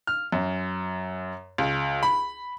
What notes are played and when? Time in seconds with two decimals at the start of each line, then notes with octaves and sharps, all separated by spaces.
0.07 F6
0.32 F#2
1.58 C#2
2.03 B5